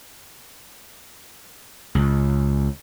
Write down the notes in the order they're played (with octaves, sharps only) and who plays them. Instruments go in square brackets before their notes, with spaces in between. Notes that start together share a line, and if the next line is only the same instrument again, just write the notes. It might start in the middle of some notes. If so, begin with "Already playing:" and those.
[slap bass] C#2